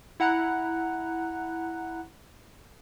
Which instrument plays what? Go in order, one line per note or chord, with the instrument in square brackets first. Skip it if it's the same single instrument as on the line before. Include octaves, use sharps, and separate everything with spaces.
[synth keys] E4 F#5 A#5 F#6